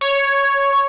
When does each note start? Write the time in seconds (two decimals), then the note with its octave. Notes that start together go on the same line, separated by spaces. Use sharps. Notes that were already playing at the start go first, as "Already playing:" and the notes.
0.01 C#5